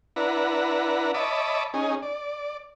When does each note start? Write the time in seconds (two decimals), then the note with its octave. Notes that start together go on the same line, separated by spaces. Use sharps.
0.16 D4 E4 B4 F#5 A#5
1.14 C#5 D#5 E5 A5 B5 D6
1.74 C#4 D#4 G#4
2.02 D5